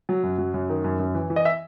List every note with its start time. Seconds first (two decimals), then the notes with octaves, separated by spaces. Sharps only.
0.09 F#3
0.23 F#2
0.38 F#3
0.54 F#2
0.69 D#3
0.84 F#2
0.99 F#2
1.15 E3
1.30 E3
1.36 D#5
1.45 E5